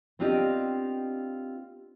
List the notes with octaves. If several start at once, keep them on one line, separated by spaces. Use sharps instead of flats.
B3 C4 D4 F4 G4 D#5